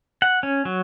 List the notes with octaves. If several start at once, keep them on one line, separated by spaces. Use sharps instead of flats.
F#5
C#4
F#3